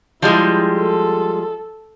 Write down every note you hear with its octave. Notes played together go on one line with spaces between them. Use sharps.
F3 G3 G#3 E4
A4